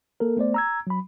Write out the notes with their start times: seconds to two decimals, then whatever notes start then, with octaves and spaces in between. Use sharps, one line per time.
0.20 A#3 A4 A#4
0.37 A3 B3 C5 D5
0.54 A#5 E6 G#6
0.87 F#3 B5